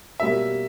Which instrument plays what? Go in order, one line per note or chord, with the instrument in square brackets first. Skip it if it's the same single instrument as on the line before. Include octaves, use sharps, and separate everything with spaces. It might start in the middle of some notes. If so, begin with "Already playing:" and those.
[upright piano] B2 G3 A#3 C#4 [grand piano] E5